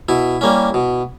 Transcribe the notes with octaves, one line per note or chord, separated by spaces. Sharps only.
B2 E4
G3 A#3 C#4
B2